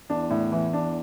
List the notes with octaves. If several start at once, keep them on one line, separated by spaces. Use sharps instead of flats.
E2 D4
A2
E3
D4